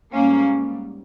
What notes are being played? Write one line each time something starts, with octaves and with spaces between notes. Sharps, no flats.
G#2 G3 A#3 C#4